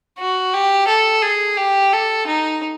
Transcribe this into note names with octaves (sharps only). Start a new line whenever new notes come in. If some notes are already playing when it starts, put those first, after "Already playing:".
F#4
G4
A4
G#4
G4
A4
D#4